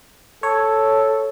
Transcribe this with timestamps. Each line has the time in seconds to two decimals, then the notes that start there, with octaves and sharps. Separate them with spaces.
0.43 A4 C#5